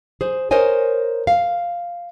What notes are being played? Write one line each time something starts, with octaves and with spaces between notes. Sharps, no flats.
G#4 C5
A#4 C5 C#5 D#5 G#5
F5